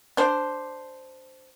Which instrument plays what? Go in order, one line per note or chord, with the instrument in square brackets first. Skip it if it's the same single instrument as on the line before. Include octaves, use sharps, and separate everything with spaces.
[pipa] D4 C5